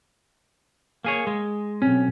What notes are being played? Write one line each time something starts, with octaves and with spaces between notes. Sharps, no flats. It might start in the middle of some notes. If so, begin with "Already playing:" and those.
A#3 G#4 C#5
G#3
B1 C4 C#4